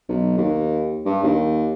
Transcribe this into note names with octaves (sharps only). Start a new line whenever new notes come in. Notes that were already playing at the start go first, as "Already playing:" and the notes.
B1
D#2
G2
D#2